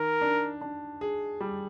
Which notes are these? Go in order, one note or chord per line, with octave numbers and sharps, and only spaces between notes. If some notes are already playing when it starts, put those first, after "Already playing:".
Already playing: D#3 A#4
D4
D4
G#4
G3